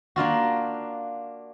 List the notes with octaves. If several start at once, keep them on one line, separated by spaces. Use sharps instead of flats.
A#3 D4 F4 F#4